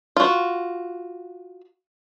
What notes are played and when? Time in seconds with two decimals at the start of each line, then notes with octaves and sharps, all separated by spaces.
0.17 F4 F#4